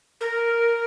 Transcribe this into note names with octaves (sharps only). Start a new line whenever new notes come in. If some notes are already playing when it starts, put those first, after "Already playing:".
A#4